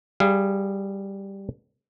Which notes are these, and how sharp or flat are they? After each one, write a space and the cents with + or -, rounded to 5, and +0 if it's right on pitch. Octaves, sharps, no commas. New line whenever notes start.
G3 +0 G#4 -10 F5 -25